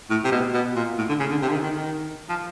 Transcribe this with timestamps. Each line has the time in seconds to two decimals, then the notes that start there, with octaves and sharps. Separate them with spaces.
0.10 A2
0.24 C3
0.32 B2
0.54 B2
0.76 A#2
0.98 A2
1.09 D3
1.20 C#3
1.31 D3
1.42 C3
1.48 D3
1.52 D#3
1.64 D#3
1.75 D#3
2.29 F3